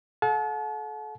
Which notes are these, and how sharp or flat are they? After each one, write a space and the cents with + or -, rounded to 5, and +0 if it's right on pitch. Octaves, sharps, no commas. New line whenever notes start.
A4 -35 F#5 -40 A5 -40